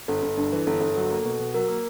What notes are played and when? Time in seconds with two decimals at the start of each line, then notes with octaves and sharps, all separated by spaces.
0.08 G1 A4
0.22 G1
0.37 G2
0.52 E3
0.67 G1 A4
0.81 G1 A4
0.96 F#3
1.11 A#3
1.25 B2
1.39 B2
1.54 F#3 A#4
1.68 A#3